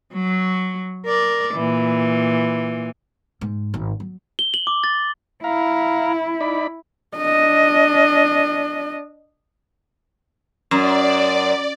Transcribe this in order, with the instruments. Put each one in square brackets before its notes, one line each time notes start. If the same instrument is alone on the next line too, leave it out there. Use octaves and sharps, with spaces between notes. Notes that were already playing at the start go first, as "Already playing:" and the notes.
[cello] F#3
A#4 D5
A#2 E3
[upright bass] G#2
G#1
F#3
[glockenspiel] G7
F#7
D6
A6
[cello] E4 [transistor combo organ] F5 A#5
[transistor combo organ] D#4 D5 B5
[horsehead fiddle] D4 D#5
[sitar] F#2 [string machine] D5